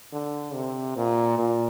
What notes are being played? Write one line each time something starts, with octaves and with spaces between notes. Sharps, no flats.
D3
C3
A#2
A#2